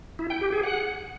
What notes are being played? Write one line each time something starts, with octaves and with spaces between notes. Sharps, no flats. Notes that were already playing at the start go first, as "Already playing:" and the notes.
E4
G5
G4
G#4
F#5